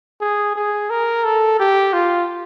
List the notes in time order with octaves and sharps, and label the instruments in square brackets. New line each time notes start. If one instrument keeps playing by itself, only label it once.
[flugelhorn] G#4
G#4
A#4
A4
G4
F4